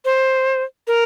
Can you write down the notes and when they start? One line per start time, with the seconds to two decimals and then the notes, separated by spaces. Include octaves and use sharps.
0.05 C5
0.87 A#4